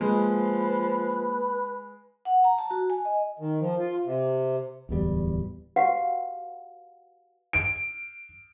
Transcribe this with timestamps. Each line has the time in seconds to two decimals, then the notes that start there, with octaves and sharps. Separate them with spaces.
0.01 F3 G#3 A#3 B4
2.25 F#5
2.44 A#5
2.58 A5
2.71 F#4
2.90 G#5
3.05 D#5
3.39 D#3
3.60 F3
3.79 F4
4.05 C3
4.89 D1 E2 G3
5.76 F#4 G4 B4 F5 F#5
7.53 D7